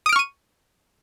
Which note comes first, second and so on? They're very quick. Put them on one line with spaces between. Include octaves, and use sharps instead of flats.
D#6 D7 F6 C#6 D#7